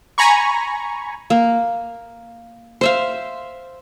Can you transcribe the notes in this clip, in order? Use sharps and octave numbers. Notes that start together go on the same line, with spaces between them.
G#5 A#5 B5 C#6
A#3
C5 E5 F5